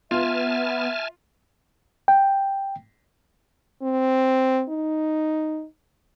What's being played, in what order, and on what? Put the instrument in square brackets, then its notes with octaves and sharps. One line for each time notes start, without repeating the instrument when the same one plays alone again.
[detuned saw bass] B3 [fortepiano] F4 [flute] E5 [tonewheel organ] G#5 A5 F6
[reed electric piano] G5
[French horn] C4
D#4